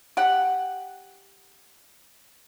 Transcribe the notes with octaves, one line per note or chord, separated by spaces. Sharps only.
G4 F#5